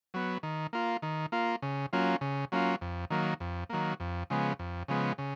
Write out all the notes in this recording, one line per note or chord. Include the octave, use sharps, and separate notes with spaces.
F#3 B3
D#3
A#3 F4
D#3
A#3 F4
C#3
F#3 A#3 C#4 F4
C#3
F#3 A#3 C#4 F4
F2
D#3 F#3 A#3
F2
D#3 F#3 A#3
F2
C#3 F3 G#3 B3
F2
C#3 F3 G#3 B3
C#3